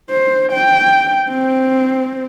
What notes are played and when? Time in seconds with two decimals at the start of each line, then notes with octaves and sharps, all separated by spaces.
0.10 C5
0.52 G5
1.29 C4